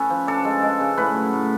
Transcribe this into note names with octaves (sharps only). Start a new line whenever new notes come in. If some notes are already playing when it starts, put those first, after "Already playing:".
Already playing: A2 C#4 A4 B4
F3
D4 A4
G#3
G#3
C#3
A2 B4
F#3
A2